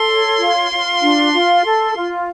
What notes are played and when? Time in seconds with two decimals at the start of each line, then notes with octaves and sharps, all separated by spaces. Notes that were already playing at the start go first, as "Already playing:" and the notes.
Already playing: A4 C6
0.08 C#5
0.39 F4
0.71 F4
1.02 D4
1.33 F4
1.64 A4
1.96 F4